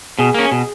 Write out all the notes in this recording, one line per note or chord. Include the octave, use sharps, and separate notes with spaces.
B2 G#4
A#3 C#4
B2